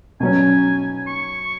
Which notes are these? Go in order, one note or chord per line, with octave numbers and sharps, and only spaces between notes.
B2 F#3 C#4 G#5
C#6